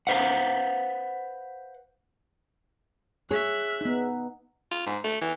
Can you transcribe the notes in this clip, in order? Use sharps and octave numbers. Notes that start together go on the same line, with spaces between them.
B4 C5 F5 F#5
G#4 C#5 E5 F#6
B3 D#4
F4
G#2
A3
E3